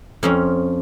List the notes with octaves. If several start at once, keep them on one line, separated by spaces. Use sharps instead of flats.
F2 F3 C#4